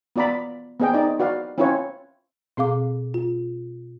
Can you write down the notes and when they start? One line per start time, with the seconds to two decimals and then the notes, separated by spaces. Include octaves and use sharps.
0.16 B3 F4 D5 A#5 B5
0.80 B3 C4 G#4 D#5 G5
0.94 C4 D#4 D5
1.20 F#4 B4 D5 F5
1.58 C4 C#4 E4 F4 B4 C#5
2.57 B2 C4 G#4 F5 D6
3.14 F4